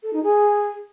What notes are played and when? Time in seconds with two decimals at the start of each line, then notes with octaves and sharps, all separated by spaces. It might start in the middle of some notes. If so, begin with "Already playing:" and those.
0.03 A4
0.13 D#4
0.23 G#4